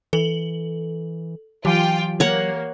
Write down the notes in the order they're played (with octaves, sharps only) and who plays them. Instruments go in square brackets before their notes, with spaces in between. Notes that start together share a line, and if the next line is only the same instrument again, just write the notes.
[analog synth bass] E3 [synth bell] A4 F#7
[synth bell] E3 G4 [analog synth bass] F#3 [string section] F4 G5
[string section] A#3 [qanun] C#5 F#5